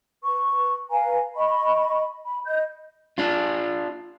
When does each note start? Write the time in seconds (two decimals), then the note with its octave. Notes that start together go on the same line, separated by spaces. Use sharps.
0.22 B4 C#6
0.90 B4 F5 G#5 A#5
1.36 D#5 B5 C#6
2.25 B5
2.46 D#5 G6
3.18 D4 F4